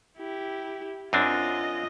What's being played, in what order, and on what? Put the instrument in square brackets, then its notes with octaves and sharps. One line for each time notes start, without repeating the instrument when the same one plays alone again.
[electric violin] E4 G4
[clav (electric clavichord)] F#2 C4 D4 [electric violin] F4 D#5